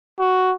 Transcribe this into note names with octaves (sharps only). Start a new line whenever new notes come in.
F#4